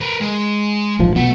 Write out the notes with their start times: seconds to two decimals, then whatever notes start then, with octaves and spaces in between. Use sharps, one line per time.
0.01 A#4 B4
0.21 G#3
0.99 A#1 G#2 F3
1.16 B2 F#3 A3 B3